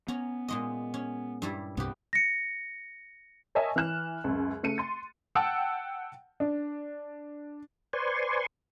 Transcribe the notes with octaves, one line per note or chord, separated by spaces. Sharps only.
B3 C#4 A#5
A#2 G#3 D#5
C#4
G2 G3 E4
C2 G2 C3 B3 G4
A#6 C#7
A#4 C#5 D#5 E5 G#5 A5
E3 F6 F#6 E7
C#2 F#2
C#3 A3 C#7 D#7
C6 A6
F#5 G5 A5 E6
D4
B4 C5 D5 G#5 C6 C#6